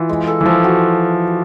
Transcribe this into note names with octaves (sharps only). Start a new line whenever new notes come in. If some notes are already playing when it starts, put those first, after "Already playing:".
Already playing: E3 F4
G#3
A4
E3
F3 A4
F#4